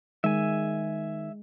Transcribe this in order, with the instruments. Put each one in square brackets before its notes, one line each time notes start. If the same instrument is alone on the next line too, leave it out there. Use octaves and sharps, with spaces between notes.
[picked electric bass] D#3 [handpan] G#3 [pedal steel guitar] E5 G#5